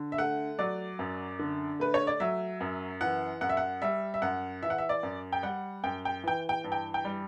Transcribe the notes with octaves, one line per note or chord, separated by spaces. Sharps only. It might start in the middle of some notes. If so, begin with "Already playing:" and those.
Already playing: D3
E5
A3 F#5
F#3 D5
F#2
D3
A3 B4
C#5
D5
F#3 E5
F#2
E3 F#5
F#2 F#5
E5
F#5
G3 E5
E5
F#2 F#5
E3 E5
F#5
E5
D5
F#2
G5
G3 F#5
F#2 G5
G5
E3 G5
G5
G2
G5
G5
G3